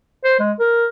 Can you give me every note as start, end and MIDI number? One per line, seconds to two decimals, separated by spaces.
0.25 0.35 72
0.40 0.52 56
0.60 0.86 70